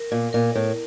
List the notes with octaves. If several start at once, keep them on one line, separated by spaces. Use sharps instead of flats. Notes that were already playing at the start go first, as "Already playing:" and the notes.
Already playing: A#4
A#2
A#2 A#4
A2